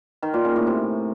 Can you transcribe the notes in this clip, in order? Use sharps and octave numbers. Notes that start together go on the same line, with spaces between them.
D#3
A#2
C#3
A2
C3